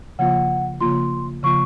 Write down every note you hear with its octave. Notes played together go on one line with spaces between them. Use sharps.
C#3 F3 A#3 F4 F#5
C#3 F3 A#3 F4 C6
C#3 F3 A#3 F4 C#6